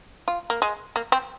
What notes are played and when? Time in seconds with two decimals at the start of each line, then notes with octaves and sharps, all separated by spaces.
0.28 F4
0.50 A#3
0.62 G#3
0.96 A#3
1.12 C4